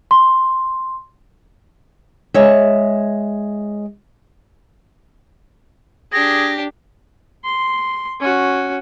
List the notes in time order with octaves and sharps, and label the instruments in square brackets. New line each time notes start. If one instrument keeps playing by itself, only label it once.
[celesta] C6
[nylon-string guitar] G#3 C#5 E5
[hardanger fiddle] D4 G4 [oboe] G#4 [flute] A#6
[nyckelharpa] C6
C#4 F#4